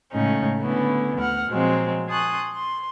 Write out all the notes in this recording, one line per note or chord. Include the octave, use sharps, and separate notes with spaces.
A2 C#3 G#3 A3 C#4 D#4
D3 A3 B3 C#4 E4
D2 F#5 F6
A#2 F3 F#3 G#3 C4
G#5 A5 C6 C#6 D#6 F#6
C6